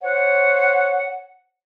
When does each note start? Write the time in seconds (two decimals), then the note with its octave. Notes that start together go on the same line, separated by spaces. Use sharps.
0.03 C5 C#5 F#5